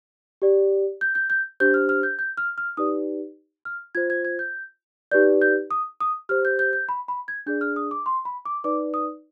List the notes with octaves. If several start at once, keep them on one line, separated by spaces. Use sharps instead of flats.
G4 D5
G6
G6
G6
D4 G4 C5 G6
F6
F6
G6
G6
F6
F6
D#4 G4 B4 D5 D#6
F6
F4 C5 G#6
G#6
G#6
G6
D#4 G4 B4 D5 G6
G6
D#6
D#6
G4 C5 F6
G6
G6
G6
B5
B5
G#6
D4 G#4 D5 G6
F6
D#6
D6
C6
B5
D6
D#4 B4 D5 D6
D#6